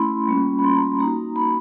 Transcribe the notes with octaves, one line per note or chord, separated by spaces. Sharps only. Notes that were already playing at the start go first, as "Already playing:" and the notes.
Already playing: A3 C#4 E4 B5 C6
G3 A#3 C#4 F4
B5
C6
A#5
A#3 D#4 F#4 A#5
B5